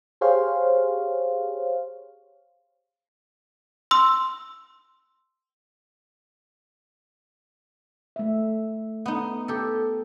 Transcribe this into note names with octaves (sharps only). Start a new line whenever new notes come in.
G4 G#4 C5 C#5 F5
C6 E6
A3 E5
B3 D#4
G4 A4